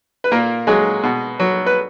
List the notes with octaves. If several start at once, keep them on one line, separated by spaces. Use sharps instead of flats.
B4
A#2 A#3 A#4
F#3 G#3 G#4
B2
F#3
B4